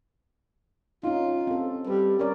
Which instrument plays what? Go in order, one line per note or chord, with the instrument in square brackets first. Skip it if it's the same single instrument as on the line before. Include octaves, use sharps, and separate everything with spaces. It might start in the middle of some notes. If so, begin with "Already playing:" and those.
[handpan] C#4 D#4 [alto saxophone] F4
[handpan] C4 A4
[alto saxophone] G3 [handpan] B4
[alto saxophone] C#4 [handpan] A#4 D5